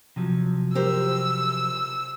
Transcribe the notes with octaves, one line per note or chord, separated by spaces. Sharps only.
C3 F3 F#3
G4 A#4 C5 E6